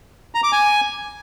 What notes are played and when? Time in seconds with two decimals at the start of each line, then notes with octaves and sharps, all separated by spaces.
0.35 A#5
0.43 D6
0.52 G#5